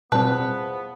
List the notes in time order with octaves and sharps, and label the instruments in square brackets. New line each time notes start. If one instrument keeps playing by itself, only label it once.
[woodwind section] E2 F3 B3 [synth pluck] B2 G3 C4 [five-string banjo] B4 [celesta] A5